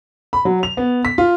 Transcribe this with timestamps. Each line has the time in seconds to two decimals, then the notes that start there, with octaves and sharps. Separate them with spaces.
0.33 B5
0.45 F#3
0.63 F7
0.77 B3
1.05 B6
1.18 F4